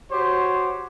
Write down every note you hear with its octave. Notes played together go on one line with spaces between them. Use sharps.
F#4 G4 C5 C#5